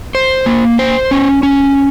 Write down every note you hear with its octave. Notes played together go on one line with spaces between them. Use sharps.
C5
A#3
C5
C#4
C#4